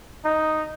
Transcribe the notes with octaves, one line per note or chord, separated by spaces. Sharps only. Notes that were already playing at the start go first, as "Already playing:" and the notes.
D#4